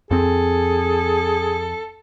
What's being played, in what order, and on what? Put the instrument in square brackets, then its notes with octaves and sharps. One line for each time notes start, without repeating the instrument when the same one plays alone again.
[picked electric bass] F2 C4 [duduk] G#4 [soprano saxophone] A4